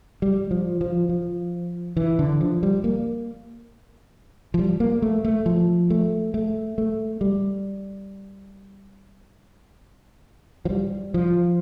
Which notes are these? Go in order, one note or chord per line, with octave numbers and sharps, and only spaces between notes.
G3
F3
F3
F3
E3
D3
F3
G3
A#3
F3
G3
A#3
A3
A3
F3
A3
A3
A3
G3
F3
G3
F3